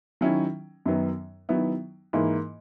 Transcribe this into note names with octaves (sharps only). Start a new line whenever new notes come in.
D#3 F#3 C#4 E4
F#2 D#3 F#3 B3
D#3 F#3 B3 E4
G#2 E3 A#3 E4